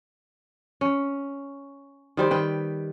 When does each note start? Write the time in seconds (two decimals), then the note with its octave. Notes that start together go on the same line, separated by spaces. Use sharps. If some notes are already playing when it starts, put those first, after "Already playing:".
0.81 C#4
2.17 D#3 G3 C5
2.31 D#3 B4 G5